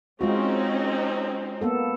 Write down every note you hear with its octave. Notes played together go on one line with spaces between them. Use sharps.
G#3 C4 C#4 D#4 F4 F#4
A#3 B3 A4